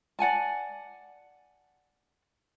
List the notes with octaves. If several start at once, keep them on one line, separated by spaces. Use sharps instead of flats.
D5 F#5 G#5 A5